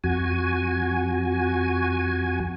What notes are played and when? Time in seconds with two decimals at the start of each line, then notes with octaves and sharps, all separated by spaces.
0.04 F2 F#4 G#5